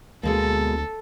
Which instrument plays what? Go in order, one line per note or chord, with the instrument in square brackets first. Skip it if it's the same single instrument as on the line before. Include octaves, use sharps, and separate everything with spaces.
[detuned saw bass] D2 [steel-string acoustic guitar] B2 G#3 A#3 [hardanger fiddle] A4